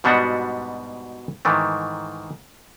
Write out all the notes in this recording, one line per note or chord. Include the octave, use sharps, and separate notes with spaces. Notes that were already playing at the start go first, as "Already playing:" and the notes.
G#2 B2 G3 B3 D4 F#4
G#2 D#3 E3 A3